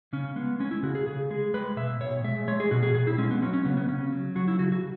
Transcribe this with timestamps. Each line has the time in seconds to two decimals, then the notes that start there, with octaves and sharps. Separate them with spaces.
0.13 C#3 C#4
0.36 G#3 B3
0.60 G#3 C#4
0.71 E4
0.83 C#3 F#4
0.95 G#4
1.06 C#3 G#4
1.30 G#3 G#4
1.54 G#3 B4
1.77 B2 E5
2.01 B2 C#5
2.24 G#3 E5
2.48 G#3 C#5
2.60 G#4
2.71 B2 F#4
2.83 G#4
2.95 B2 G#4
3.07 E4
3.18 G#3 C#4
3.31 B3
3.42 F#3 C#4
3.53 C#4
3.65 C#3 B3
3.77 B3
3.89 C#3 C#4
4.12 F#3
4.36 F#3 F#4
4.48 E4
4.59 C#3 F#4
4.72 F#4